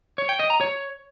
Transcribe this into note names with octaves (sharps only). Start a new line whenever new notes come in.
C#5
G5
D#5
A#5
C#5